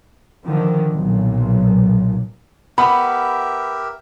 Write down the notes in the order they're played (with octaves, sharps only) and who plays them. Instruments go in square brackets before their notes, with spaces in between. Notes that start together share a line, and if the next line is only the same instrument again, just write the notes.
[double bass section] D3 D#3 F3
B1 A#2
[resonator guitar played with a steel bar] B3 [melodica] G4 A#4 E5 [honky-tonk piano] B5